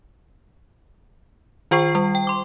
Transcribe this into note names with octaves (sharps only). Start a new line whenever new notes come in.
D#3 F4 C5 G5 C#6 C7
G3
G5
C6 D6